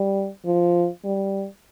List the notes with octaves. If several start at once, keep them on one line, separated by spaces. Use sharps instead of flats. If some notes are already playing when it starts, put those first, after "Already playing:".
Already playing: G3
F3
G3